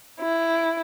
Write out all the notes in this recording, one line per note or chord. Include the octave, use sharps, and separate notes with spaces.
E4